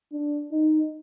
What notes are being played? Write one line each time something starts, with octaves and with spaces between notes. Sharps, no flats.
D4
D#4